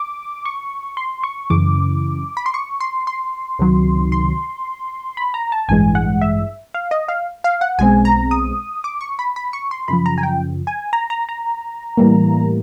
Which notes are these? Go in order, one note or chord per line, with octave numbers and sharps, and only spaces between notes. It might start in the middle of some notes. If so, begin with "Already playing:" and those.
Already playing: D6
C#6
C6
C#6
F#2 C#3 E3 D6
B5
C6
C#6
C6
C6
C#2 C3 D#3 F#3
C6
B5
A#5
A5
A1 G2 E3 G#3 G#5
F#5
E5
F5
D#5
F5
F5
F#5
B1 B2 G#3 C4 G#5
A#5
D#6
D6
C#6
B5
B5
C#6
C6
F#2 C#3 F3 B5
A#5
G#5
G5
G#5
A#5
A#5
A#5
A2 E3 G3 A#3